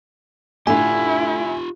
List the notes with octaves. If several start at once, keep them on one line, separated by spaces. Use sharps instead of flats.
A2 D3 E4 F4 G4 G#5